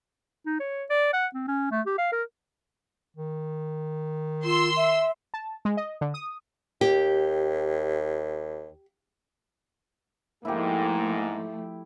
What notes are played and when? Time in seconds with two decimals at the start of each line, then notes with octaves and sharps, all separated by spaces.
0.46 D#4
0.60 C#5
0.90 D5
1.13 F#5
1.34 C4
1.48 C#4
1.71 A3
1.86 G4
1.98 F5
2.12 A#4
3.16 D#3
4.45 F4 C6 E6
4.76 E5
5.34 A5
5.65 G#3
5.77 D#5
6.01 D3
6.14 D#6
6.81 D#2 G4
10.45 G#2 F3 A3 A#3 E4 G4